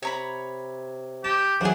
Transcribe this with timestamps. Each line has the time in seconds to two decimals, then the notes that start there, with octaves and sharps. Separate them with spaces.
0.03 C3 C#5 A#5 B5
1.24 G4 A5
1.61 G#2 E3 F#3 D4 G#4 F#5